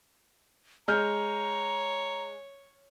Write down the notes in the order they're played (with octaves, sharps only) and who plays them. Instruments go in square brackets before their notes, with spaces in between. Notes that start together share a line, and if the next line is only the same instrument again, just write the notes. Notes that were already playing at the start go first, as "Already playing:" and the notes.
[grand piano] G#3 F6 G6 [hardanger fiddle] C#5 [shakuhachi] A#5